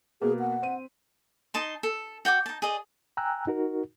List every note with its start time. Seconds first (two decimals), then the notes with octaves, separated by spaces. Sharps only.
0.22 B2 A#3 G#4
0.40 F#5
0.62 C4 D#7
1.54 D#4 D#5 A5 C6
1.83 A4
2.25 F#4 G5 G#5 D6
2.46 D#4 A5
2.62 G#4 D5 D#5
3.17 G5 G#5 A#5 E6 F#6
3.47 D#4 F#4 A#4